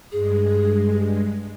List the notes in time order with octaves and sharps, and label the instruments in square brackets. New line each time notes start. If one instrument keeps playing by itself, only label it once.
[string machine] G2 G#3 [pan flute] G#4